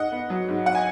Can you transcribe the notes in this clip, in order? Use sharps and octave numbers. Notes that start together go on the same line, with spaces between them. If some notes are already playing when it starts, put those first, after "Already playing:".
Already playing: G#2 D#5 F#5
B3
F#3
G#2
F#5
G#5